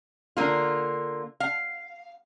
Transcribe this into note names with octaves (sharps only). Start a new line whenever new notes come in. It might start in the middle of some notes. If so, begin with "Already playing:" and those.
D3 A#3 F4
F5